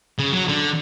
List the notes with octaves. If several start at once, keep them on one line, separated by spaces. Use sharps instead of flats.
C#3
F#3
D3